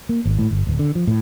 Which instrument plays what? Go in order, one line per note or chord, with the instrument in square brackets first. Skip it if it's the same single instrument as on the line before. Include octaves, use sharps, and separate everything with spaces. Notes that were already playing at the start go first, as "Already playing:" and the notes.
[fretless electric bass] A#3
G#1
A2
G1
D1
D3
F3
A2